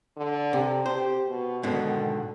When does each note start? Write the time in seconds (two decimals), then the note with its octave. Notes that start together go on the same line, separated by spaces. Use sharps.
0.17 D3
0.53 C3
0.86 G4 C5
1.28 B2
1.63 G#2 B2 D3 D#3